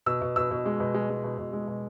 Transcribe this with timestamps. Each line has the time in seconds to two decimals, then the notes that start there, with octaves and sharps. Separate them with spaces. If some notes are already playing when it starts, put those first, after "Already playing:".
0.06 B2 E6
0.21 B2
0.36 B2 E6
0.51 B2
0.66 G#3
0.80 B2
0.94 G#3
1.10 G#3
1.24 B2
1.38 B2
1.53 G#3
1.68 B2